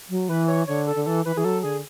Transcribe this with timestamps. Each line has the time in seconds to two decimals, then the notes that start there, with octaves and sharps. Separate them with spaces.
0.09 F#3
0.28 E3 B4
0.48 C#5
0.67 D3 C#5
0.87 A4
0.95 D3
1.06 E3 A4
1.25 E3 B4
1.36 E3 G#4
1.44 F#3 A4
1.63 D3 G#4